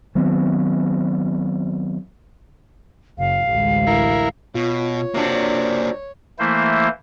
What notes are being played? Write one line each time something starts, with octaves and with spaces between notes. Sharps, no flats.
D#3 F#3 B3 C4
F#1 F5
A1 D2 G#3
E4 A#4
B2 F4 C#5
C3 A#3 D4 F#4
E3 A3 A#3 E4 C5